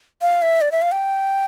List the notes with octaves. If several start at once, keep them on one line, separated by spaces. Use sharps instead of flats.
F5
E5
D5
E5
F5
G5